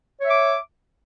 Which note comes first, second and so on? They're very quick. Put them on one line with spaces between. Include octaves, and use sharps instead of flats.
C#5 E5 D6